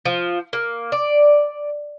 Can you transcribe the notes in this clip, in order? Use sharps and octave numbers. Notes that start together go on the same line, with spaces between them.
F3
A#3
D5